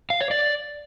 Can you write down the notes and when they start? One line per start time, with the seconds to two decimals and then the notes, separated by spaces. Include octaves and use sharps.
0.10 F5
0.21 C#5
0.31 D5